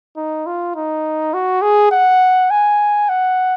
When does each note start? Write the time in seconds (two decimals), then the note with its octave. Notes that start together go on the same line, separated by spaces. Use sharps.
0.17 D#4
0.46 F4
0.75 D#4
1.34 F#4
1.62 G#4
1.91 F#5
2.51 G#5
3.09 F#5